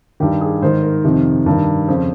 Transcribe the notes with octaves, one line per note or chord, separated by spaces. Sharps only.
G2 D#3 G4
G#4
G#2 D#3 C5
A#4
F2 C3 D#3
G2 D#3 A#4
F2 C#3 C5